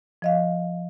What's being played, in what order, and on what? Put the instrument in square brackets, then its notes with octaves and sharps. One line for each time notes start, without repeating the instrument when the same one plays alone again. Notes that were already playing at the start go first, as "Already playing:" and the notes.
[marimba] F3 D#5 F5